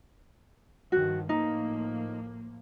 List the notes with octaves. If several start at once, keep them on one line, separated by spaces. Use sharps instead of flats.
G2 D#3 F3 F#4
A2 F3 A#3 D#4